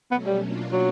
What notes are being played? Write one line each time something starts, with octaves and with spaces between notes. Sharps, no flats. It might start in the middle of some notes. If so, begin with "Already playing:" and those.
B2 F#3 A3 B3 C#4
G3
B2 F#3 A#3 D4 F4
F#3